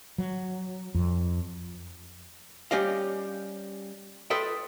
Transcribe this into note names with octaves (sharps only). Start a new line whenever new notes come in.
F#3
F2
G3 C#4 G4 D#5 F5
F4 A4 B4 D#5 E5 G5